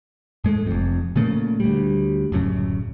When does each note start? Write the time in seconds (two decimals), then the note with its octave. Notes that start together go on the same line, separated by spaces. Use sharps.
0.44 G#2 G#3 A3
0.66 F1 F2
1.16 A#2 C#3 A3 A#3
1.60 D2 G3
2.32 D1 F#2 C#3